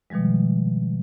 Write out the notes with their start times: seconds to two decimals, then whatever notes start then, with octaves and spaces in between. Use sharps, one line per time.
0.10 B2 D#3 F3 G3 G#3